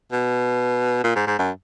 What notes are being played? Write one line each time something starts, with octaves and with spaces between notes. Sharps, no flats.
B2
A#2
G#2
G#2
F#2